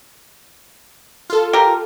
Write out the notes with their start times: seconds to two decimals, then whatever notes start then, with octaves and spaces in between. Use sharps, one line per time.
1.30 F4 A4
1.53 G4 A#4